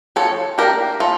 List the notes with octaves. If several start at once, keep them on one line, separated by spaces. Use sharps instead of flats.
F3 A4 C#5
A#3 D4 G4 A#4
E3 F4 A4